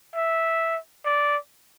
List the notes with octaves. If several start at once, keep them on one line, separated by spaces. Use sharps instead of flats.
E5
D5